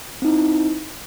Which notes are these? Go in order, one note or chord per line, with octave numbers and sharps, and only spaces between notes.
C4 D#4 E4